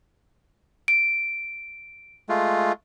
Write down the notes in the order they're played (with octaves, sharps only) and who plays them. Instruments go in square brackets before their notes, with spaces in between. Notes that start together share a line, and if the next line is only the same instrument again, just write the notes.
[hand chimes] D7
[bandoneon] G#3 A3 F4